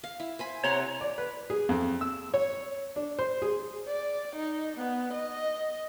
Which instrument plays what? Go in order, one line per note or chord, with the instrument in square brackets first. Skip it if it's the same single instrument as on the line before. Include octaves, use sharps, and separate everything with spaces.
[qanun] F5
E4
C5 G#5 B5
[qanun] C3 F#5 C6 [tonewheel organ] C#5 A#5
[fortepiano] D5
B4
G#4
F2
E6
C#5
D4
C5
G#4
[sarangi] D5
D#4
B3
D#5